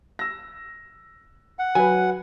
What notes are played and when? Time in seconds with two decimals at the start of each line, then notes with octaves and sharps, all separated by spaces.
0.19 E6 A#6
1.59 F#5
1.75 F#3 B4 G#5